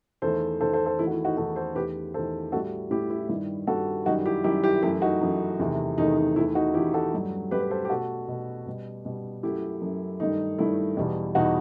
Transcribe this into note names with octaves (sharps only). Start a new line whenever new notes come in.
E2 D#3 A3 A4 C5
E2 D#3 A3 A4 C5
A4 C5
A4 C5
E2 D#3 A3 E4
F#4
E4
D#4 F#4
E2 D#3 A3 F#4 A4
A4 C5
E2 D#3 A3 G4 B4
E2 D#3 A3 A4 C5
A2 G3 F#4 A4
A2 G3 E4 G4
E4
G2 D#3 G3 E4
G2 D#3 G3 F#4 A4
F#2 D#3 G3 D#4 F#4
E4 G4
F#2 D#3 G3 E4 G4
E4 G4
F#2 E3 A3 E4 G4
D#4 F#4
F#2 E3 A3
E2 C3 D#3 A3
E2 C3 D#3 A3 D#4
D#4
E2 D#3 A3 E4
D#4 F#4
E2 D#3 A3 E4 G4
F#4 A4
G2 F#3 A3
G2 F#3 A3 G4 B4
B4
A4 C5
G4
B2 A3 F#4 A4
B2 A3
B2 G3
B2 G3
F#2 F#3 A3 E4 G4
F#2 F#3 A3
G2 D#3 A3 D#4
G2 D#3 A3 E4
E2 B2 G3
E2 B2 G3 D#4 F#4